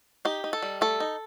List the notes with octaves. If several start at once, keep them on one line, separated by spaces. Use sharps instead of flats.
D#4 G4
D#4
A4
G3
A3 A4
D#4